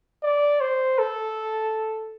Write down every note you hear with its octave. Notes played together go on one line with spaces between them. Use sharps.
D5
C5
A4